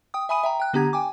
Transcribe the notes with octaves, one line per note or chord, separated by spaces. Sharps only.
G5 D#6
E5 G#5 B5 D#6 D#7
E5 G5 A#5
G5 F#6
D3 B3 D4 G4 A#5 G#6
G5 G#5 D6